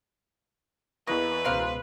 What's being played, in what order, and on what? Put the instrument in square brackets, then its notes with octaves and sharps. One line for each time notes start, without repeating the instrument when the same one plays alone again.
[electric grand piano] E2 E3 C#6 [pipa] A#3 [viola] B4 [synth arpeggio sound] D#5
[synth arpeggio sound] C#2 B2 C6 [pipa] A#4 C5 F5